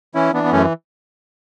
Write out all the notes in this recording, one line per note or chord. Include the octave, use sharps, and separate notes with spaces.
E3 C#4 E4
E3 B3 D4
B3
F#2 A3 C#4